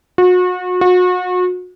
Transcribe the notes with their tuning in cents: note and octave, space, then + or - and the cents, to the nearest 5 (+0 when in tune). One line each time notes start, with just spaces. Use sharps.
F#4 -35
F#4 -35